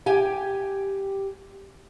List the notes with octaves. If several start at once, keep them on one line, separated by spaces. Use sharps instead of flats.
G4 G5 G#5